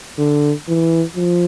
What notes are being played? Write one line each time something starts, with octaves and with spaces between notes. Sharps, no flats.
D3
E3
F3